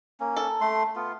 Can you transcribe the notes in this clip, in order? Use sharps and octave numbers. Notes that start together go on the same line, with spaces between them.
A#3 C#4
A4
A3 C6
B3 F4